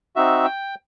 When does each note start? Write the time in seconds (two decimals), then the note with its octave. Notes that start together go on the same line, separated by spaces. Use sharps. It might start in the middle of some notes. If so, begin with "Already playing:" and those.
0.16 C4 D#4 F#4 E5
0.44 G5